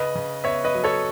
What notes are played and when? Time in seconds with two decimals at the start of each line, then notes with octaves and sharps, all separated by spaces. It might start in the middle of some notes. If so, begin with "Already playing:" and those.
Already playing: C#3 B4 D#5
0.15 C#3
0.44 B3 C#5 E5
0.64 B4 D#5
0.75 F#3
0.84 A4 C#5